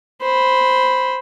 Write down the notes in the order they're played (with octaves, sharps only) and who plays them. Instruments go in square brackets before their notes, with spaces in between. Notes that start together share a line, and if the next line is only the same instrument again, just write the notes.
[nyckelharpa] C5 B5